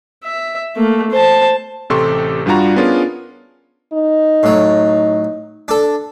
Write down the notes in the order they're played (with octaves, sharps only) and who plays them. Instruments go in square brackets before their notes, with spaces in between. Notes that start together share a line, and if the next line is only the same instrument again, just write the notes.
[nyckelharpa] E5
A3 A#3
C5 A5
[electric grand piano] A1 C3 G4 A4 C6 C#6
G2 G3 D4 F4 F#4 A#5
B3 C#4 D4 F4 G#4 A#4
[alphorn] D#4
[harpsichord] A2 F#3
D4 A4